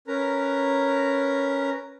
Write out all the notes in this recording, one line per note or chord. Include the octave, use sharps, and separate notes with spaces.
C#4 A#4 B4 A#5